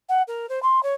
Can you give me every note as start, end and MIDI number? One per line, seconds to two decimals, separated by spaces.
0.09 0.23 78
0.28 0.49 70
0.49 0.62 72
0.63 0.82 84
0.83 0.94 73